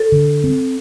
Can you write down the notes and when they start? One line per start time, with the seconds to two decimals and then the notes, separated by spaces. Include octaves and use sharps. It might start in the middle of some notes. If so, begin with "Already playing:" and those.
Already playing: A4
0.12 D3
0.44 C4